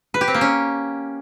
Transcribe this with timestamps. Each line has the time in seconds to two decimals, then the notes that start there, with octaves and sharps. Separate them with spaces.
0.14 B4
0.21 G4
0.28 C4
0.34 A#3
0.41 C#4